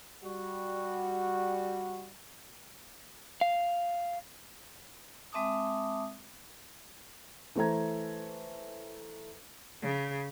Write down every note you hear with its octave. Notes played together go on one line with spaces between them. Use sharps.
G3 F#4
F5
G#3 C4 E5 A5 D6 D#6
E3 A3 C5 A#5 G#6
C#3